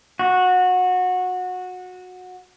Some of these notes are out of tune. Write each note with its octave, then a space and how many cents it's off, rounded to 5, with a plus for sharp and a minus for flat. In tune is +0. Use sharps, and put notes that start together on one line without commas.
F#4 -20